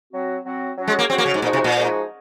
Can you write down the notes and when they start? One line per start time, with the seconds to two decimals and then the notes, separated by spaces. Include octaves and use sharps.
0.12 F#3 C4 F#4
0.44 F#3 C4 F#4
0.77 F#3 C#4 F#4
0.88 G#3
0.99 A#3
1.09 F#3 C4 C#4 F#4
1.18 A#3
1.26 C#3
1.34 G#2
1.42 A#2 F3 G#3 D#4 F#4
1.53 C3
1.64 A#2
1.75 F3 G#3 D#4 F#4